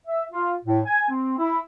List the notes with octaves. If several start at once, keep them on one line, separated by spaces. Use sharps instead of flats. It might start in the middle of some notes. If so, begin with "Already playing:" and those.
E5
F4
A2
G#5
C4
E4